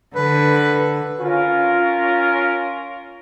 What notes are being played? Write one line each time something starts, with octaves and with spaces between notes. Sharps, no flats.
D3 B4
C#4 F4 A#4